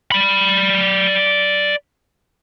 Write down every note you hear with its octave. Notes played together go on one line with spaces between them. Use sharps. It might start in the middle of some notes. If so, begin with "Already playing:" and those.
D5 B5